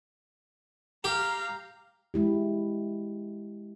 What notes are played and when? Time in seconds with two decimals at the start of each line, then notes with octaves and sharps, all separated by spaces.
1.04 G4 F5 A#5
2.14 G#3 E4 G4